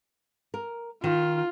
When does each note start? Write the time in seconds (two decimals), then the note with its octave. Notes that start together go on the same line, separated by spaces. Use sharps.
0.54 A#4
1.04 D#3 F4